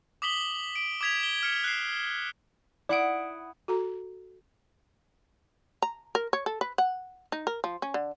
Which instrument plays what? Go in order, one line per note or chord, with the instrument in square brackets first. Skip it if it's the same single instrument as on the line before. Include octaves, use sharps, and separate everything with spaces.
[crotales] D6 D#6 B6 F#7 G7
D7
D6 D#6 G#6 B6 F7
G7
F6 C#7
F#6 C7
[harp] E4 F#5 D#6 [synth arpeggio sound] D5 D7
[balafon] F#4 A4 A#5
[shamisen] A#5
A#4
C#5
A4
B4
F#5
D#4
A#4
F3
C#4
D3